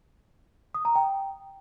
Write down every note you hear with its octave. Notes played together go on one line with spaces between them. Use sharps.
D#6
A#5
G5